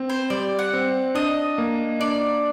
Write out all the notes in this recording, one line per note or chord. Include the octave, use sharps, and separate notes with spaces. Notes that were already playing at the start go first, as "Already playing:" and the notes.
Already playing: C4
C5
G3 D5
F#5
C4
D4 D#5
A#3
D4 D5